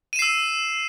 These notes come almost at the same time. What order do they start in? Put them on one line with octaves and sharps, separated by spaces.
D#7 E7 C7 E6